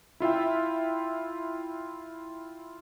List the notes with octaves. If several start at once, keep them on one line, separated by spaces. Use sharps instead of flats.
E4 F4 E5 G5